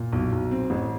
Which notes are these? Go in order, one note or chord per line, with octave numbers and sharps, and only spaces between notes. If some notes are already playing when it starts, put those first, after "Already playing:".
Already playing: A#2
B1
B1
C4
A1